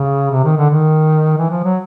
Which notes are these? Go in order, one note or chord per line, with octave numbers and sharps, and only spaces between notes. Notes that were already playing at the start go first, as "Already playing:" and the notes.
Already playing: C#3
C3
D#3
D3
D#3
E3
F3
F#3